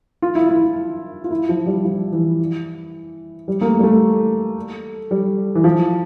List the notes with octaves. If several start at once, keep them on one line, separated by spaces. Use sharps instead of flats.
F4
E4
E4
F4
F4
E4
F3
G3
F3
E3
G3
A#3
A3
G3
A3
G3
E3
F3